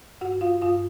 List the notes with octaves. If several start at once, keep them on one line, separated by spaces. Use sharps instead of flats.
G2 F#4 F#5
F4 F5
G2 F4 F5